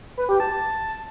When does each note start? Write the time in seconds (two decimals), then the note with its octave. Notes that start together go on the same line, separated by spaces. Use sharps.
0.17 B4
0.29 G4
0.40 A5